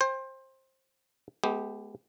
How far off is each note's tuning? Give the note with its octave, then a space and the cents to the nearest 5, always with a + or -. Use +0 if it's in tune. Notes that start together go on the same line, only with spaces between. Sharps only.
C5 +20 G5 +30
G#3 +45 B3 +10 G4 +0